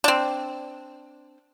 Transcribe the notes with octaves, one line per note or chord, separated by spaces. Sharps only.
C4 D4